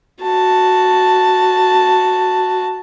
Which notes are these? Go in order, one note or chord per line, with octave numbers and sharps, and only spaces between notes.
F#4 A5